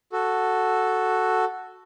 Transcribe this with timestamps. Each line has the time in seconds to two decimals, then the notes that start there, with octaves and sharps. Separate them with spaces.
0.12 F#4 A4